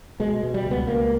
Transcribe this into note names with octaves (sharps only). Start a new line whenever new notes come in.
B2 G#3
B2
G3
C#2
B3
C#2 A#3